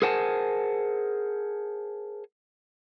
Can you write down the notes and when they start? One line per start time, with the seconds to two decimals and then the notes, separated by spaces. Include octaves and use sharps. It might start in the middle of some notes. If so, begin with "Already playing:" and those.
0.02 G#4 A#4 C5 F#5 G#5 A5